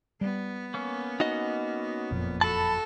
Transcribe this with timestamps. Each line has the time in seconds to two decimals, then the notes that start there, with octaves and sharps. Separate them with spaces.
0.21 G3 B3
0.74 A#3 C#4
1.20 D#4 F#4 D#5
2.11 F#1 F2 A#2
2.41 F#4 A4 A5 B5